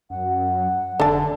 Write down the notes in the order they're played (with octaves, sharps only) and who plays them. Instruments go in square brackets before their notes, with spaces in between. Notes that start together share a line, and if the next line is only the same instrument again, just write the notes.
[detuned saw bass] F#2 [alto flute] F#5
[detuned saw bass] F1 [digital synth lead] D3 [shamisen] A4 A5